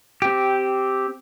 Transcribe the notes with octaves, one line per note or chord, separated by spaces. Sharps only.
C4 G4